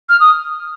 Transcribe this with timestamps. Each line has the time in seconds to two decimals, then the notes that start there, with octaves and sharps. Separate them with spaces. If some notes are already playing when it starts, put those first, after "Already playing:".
0.09 F6
0.20 D#6